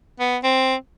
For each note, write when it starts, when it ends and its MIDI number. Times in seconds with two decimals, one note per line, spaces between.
0.20 0.37 59
0.43 0.75 60